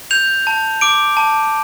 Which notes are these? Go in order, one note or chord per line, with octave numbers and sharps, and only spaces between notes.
G6 F7
A5
D6 D7
A5